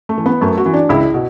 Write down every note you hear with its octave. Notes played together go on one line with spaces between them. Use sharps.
A3
E3
B3
F#2 A3
F#4
E3
D4
C#2 E4
B2